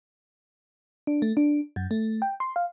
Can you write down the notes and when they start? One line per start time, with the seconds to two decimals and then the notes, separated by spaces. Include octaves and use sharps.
1.07 D4
1.22 A3
1.37 D4
1.76 F#2
1.91 A3
2.22 G5
2.40 C6
2.56 F5